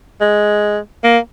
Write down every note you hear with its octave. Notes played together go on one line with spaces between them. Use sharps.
G#3
A#3